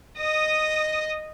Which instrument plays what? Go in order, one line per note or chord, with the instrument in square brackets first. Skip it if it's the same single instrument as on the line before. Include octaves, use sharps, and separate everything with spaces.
[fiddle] D#5 D#6